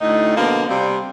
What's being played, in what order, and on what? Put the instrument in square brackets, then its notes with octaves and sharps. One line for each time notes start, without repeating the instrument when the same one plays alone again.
[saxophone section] D2 A2 D#4
B2 D3 F3 A#3
C3 G3